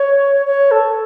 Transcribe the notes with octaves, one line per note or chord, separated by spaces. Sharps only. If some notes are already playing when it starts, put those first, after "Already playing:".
Already playing: C#5
C#5
A4